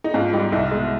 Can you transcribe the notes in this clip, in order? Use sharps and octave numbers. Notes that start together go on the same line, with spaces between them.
D#4
G#2 F4
G3 D#4
C2 D#4
B2 G#3